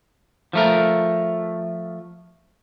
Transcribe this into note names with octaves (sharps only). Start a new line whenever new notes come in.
F3 A3 A#4